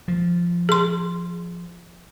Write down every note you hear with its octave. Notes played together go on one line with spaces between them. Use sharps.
F3
G#4 C6